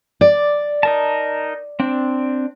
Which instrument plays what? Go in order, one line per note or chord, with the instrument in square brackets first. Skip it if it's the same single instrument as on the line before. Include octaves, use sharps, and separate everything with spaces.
[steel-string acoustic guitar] D5
[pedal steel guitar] D#4 A#4 A5
C4 D4